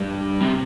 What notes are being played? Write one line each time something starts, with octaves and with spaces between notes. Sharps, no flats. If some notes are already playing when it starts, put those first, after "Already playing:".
Already playing: G2
C3